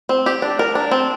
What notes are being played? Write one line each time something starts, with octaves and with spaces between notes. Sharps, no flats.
C4
G4
D4
A#4
D4
C4